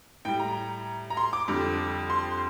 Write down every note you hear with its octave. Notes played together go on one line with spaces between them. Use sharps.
A2 G3 G5
A#5
A#5
C6
D6
F2 D3 G3
C6